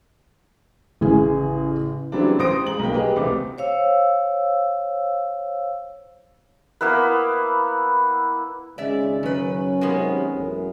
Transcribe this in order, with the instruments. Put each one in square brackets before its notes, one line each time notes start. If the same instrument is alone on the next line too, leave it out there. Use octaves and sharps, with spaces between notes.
[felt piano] A1 C#3 G#4
[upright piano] C#3 E3 F#3 G3 C4 D4
A1 C5 D#6 A#6 D7
G#3 A#5 F#7
B1 G2 A#3 G5
G4 G#4 B4 D#5
E1 C2 A3 C4 D6
[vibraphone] C5 C#5 F5 E6
[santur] A#3 B3 E4 B4
[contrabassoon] G#1 [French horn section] C#3 [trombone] G#3 [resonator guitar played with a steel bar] D5 E5
[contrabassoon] F#2 [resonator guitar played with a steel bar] D#3 B4 [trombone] C#4
[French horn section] C3 D#3 [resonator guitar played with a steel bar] G#3 A#3 B3
[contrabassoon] A1 [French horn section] F#2